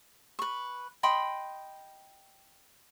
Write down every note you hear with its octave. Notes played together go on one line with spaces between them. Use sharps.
B4 C#6
D#5 G5 B5 C6